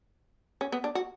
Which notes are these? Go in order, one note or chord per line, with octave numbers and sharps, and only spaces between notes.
C#4
B3
D4
F#4